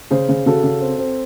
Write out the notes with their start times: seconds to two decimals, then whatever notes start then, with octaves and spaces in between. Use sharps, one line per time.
0.10 C#3 G#4 C5
0.29 C#3
0.46 C#3 F#4 A4
0.63 C#3
0.81 C4
0.99 C4